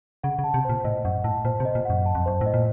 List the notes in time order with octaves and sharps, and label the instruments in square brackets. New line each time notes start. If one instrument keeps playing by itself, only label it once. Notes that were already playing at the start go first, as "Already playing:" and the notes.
[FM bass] C#3 [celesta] F#5
[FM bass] C#3
[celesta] A5
[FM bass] C3
[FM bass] A#2 [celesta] C5
[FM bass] A2 [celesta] D#5
[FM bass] F#2 [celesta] F#5
[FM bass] A2 [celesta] A5
[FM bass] A#2 [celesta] C5
[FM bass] C3
[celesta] D#5
[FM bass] A#2
[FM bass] F#2 [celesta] F#5
[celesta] A5
[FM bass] F2
[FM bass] F#2 [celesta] C5
[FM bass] A2
[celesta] D#5
[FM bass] A#2